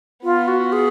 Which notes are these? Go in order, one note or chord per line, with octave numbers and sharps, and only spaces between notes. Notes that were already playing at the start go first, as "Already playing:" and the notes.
B3 F4
F#4
G#4